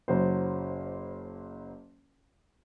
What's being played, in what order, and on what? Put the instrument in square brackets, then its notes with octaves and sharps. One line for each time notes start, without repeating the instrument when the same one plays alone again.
[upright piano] F#1 F#3 C5